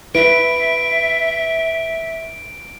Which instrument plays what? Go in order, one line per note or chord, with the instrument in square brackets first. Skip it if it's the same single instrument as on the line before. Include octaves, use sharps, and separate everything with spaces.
[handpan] E4 B4 [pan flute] E5 [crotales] D7